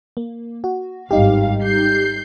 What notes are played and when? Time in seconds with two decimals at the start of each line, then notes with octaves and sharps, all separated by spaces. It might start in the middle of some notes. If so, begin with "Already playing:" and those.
0.17 A#3
0.64 F#4
1.11 G#1 G2 G3 D#4 G4 F5
1.63 G6 C7